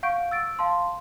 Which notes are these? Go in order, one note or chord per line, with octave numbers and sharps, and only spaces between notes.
F5 F#5 C#6 G6 D7
E6 A6 D7
F5 A5 C6